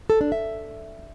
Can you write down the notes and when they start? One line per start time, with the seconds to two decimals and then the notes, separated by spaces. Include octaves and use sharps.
0.10 A4
0.21 D4
0.32 E5